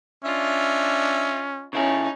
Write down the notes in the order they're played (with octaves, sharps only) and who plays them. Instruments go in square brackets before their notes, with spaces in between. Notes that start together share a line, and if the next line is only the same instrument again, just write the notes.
[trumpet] C#4 [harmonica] D4 E5 [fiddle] F4 D#5
[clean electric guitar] C#3 E4 G#4 [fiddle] C#4 D#4